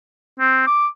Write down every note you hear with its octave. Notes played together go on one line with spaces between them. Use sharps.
C4
D6